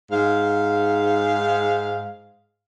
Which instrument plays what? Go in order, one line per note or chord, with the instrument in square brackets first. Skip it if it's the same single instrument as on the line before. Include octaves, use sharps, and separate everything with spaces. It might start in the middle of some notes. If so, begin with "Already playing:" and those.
[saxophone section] G#2 F5